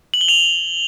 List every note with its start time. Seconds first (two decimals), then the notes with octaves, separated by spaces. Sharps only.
0.14 F#7
0.21 G7
0.28 F7